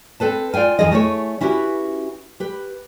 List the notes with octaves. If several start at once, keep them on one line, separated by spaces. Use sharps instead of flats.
C4 A4 B4 A5
F4 D5 F5 G5 G#5
F2 C#3 E3 F3 G#4 D#5
A3 E4 G#4 C5 C#5
C#4 E4 F#4 G4 B4
G4 B4